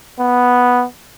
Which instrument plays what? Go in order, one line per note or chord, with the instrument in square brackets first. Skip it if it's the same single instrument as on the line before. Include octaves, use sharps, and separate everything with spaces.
[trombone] B3